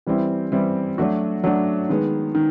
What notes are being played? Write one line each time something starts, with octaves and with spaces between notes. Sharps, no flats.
E3 G3 C4 E4
E3 G3 C4 E4
F#3 A3 D4 F#4
F#3 A3 D4 F#4
D#3 G#3 B3
D#3